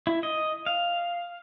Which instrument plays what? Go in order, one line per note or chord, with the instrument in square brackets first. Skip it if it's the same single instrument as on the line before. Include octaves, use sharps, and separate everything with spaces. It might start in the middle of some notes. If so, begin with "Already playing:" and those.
[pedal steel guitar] E4
D#5
F5